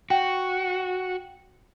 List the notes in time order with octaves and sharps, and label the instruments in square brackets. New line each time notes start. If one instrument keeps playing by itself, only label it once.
[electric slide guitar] F#4 [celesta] G5